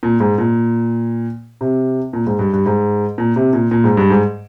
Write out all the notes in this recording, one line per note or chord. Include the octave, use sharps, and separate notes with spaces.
A#2
G#2
A#2
C3
A#2
G#2
G2
G2
G#2
A#2
C3
A#2
A#2
G#2
G2
G#2